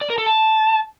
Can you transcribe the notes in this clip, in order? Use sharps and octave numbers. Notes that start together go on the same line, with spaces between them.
D5
A#4
A4
A5